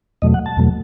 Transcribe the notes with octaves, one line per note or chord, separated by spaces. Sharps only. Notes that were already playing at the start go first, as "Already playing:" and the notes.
E2 B2 F#3 A3 D#5
F#5
A5
E2 B2 F#3 A3